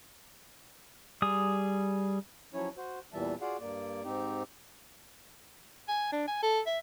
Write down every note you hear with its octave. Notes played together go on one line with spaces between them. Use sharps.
G3 G#4 D#6
F3 F#3 C#4 E4 C#5
F#4 C5
E2 A#2 E3 G3 E5 A5
F4 F#4 G#4 D5 F5 F#5
G2 A#3 D5
G#2 C4 D#4 G4
G#5
D4
G#5
A4
E5